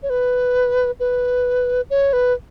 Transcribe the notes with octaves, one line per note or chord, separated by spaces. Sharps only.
C#5
B4
B4
C#5
B4